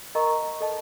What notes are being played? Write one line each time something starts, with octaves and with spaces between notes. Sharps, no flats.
A#4 D#5 A#5 C#6
A4 D#5 A5